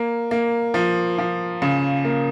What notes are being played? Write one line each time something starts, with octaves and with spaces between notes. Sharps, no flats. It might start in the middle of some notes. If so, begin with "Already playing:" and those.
Already playing: A#3
A#3
F3
F3
C#3
A#3